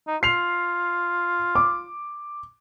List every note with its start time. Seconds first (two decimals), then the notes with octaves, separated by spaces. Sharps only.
0.07 D#4
0.23 F4 C7 F7
1.55 D6